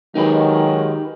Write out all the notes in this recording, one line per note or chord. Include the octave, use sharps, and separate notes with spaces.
D#3 F#3 G#3 D#4 G4 B4